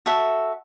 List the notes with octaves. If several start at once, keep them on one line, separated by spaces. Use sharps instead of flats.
F#4 A4 E5